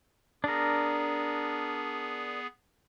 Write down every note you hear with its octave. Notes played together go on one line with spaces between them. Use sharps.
B3 D4 G#4 A#4